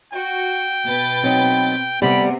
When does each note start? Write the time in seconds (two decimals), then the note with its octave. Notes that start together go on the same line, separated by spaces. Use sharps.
0.13 F#4 G5
0.86 B2 B4 A6
1.24 F#3 C4 D#4
2.02 D2 C3 G3 B3 B5